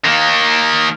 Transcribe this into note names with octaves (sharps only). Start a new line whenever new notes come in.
D#3 A#3